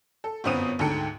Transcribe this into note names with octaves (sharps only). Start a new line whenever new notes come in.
A4
G1 F#2 B3 C4 D#6 D#7
D2 G#2 A4 G5 C#7